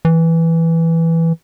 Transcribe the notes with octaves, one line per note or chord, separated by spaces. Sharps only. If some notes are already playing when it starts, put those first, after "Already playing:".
E3